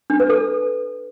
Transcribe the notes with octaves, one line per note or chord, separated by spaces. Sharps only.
D4
B4
A4